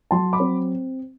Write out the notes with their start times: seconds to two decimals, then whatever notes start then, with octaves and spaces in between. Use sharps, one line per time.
0.11 F#3 A5 C6
0.33 B5 D6
0.40 C4